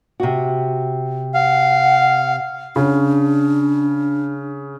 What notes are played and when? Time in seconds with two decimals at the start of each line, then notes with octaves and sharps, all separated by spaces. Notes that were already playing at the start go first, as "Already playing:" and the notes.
0.20 C3 F#4
1.34 F5 F#5
2.76 C#3 D4